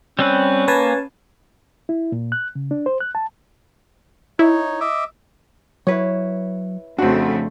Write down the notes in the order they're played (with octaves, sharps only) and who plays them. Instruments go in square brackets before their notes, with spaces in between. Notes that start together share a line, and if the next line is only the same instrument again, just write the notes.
[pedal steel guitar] G3 C4 B4 [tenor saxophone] C#4
[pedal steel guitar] A#3 [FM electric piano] B4 G#5 A5
[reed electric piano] E4
A#2
F#6
C#3
D4
C5
F#6
A5
[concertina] D#4 C#5 [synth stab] E4
[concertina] D#5 E5 D6
[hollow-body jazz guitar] F#3 [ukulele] E4 B4 C#5
[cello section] F2 C#3 A3 [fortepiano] C4 F#4 [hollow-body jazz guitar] D4 F#5